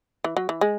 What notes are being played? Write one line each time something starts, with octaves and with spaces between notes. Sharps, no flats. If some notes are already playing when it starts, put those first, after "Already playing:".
E3
F#3
E3
G#3